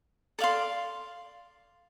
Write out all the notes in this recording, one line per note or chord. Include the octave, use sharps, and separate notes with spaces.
A4 D5 F5 C6